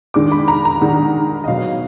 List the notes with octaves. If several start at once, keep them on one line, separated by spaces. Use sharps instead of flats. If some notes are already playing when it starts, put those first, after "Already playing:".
D#3 G#3 D4 D6
B5
A#5
A#5
D#3 G#3 D4 F#5
D#5
B2 F#3 B3 F5